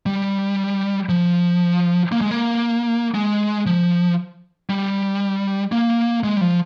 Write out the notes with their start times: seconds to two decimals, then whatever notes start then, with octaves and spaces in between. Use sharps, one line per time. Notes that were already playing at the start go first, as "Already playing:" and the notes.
0.06 G3
1.09 F3
2.12 A#3
2.21 G#3
2.31 A#3
3.14 G#3
3.66 F3
4.70 G3
5.72 A#3
6.24 G#3
6.37 G3
6.41 F3